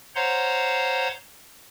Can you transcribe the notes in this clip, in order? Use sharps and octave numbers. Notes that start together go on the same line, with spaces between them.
C5 C#5 F5 F#5 A#5 C6